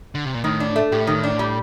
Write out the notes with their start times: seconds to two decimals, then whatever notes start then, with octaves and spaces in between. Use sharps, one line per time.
0.15 D3
0.25 C3
0.34 A#2
0.44 A2 D#3
0.60 D4
0.76 A3
0.92 A2 G4
1.07 D#3
1.24 D4
1.39 G3